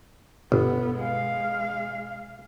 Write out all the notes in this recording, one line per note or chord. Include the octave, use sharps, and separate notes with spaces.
G1 B2 B3
G#3 F5